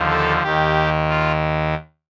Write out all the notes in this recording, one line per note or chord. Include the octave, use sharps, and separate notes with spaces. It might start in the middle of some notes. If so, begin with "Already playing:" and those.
Already playing: D#2 D3 F3
A4
D#2 D#3 G4
F4